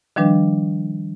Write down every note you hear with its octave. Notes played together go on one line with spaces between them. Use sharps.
D#3 F3 G3 D4 B4